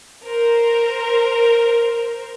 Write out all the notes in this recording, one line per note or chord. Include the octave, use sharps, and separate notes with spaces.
A#4 C5